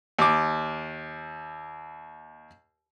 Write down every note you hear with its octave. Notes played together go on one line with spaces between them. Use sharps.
D#2 D6